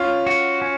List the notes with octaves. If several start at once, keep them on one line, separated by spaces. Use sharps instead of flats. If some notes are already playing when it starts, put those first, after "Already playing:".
Already playing: C#4 F4
F#4
C#4